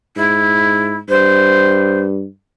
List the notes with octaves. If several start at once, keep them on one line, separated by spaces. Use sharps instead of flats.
G#2 E4
G2 C5